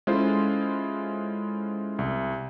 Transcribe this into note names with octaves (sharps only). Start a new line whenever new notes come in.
G#3 C#4 E4 F4 A4 C5
C2